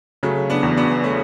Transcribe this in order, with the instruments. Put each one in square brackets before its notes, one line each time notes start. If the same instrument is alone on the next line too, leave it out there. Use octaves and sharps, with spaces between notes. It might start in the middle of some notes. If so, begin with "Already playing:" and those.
[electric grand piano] C#3 [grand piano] F#3 A3
[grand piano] B3 D4
[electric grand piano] E2
[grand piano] B3 D4
A3 C#4